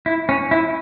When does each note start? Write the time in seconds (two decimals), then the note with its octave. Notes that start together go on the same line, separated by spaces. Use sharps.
0.06 E4
0.29 C#4
0.51 E4